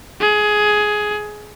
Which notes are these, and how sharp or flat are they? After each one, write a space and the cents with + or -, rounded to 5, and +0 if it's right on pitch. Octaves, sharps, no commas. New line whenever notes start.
G#4 +15